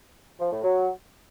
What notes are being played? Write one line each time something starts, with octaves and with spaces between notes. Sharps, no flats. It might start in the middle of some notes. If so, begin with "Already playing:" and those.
F3
A2
F#3